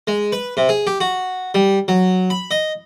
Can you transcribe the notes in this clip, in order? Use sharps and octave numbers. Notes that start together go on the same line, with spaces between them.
G#3
B4
C3
G#4
G4
F#4
G3
F#3
B5
D#5